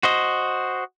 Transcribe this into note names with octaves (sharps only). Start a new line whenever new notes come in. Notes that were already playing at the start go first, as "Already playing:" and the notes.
F#4 C5 D#5